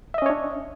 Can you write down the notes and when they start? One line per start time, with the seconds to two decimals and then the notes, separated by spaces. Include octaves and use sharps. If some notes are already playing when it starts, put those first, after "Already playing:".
0.14 E5
0.18 D#5
0.22 C#4
0.26 C#5
0.30 D4